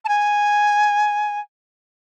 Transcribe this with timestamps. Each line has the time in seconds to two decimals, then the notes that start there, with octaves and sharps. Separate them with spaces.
0.05 A5
0.08 G#5